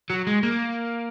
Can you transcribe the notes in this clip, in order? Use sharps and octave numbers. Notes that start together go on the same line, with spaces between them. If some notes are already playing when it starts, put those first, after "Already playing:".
F#3
G#3
A#3